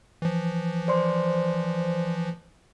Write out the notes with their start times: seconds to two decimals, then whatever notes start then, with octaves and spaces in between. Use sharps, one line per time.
0.22 E3 F3
0.88 C5 D5 C6